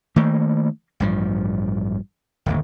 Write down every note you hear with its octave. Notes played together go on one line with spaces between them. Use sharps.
D#3 A3 A#3
A1 G2 F3
D1 G1 D#2